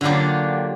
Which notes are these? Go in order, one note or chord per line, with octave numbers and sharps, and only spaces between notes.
D3 F#3 A#3 D4 F4 G4